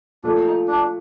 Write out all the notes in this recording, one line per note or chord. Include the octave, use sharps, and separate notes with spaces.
A#2 F3 A3 D4
D#4
D4